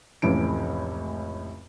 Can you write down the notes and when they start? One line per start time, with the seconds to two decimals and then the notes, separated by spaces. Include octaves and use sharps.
0.22 F1 C#2 A2 E3 D7